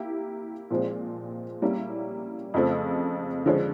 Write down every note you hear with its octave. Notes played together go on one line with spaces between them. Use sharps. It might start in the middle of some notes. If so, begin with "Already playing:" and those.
Already playing: A#3 E4 G4
A#2 F3 G#3 C4
G3 A#3 C#4 E4
F2 C#3 F3 A3
D3 F3 G#3 C#4